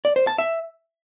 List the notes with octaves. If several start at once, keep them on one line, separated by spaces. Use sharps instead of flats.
D5
C5
A5
E5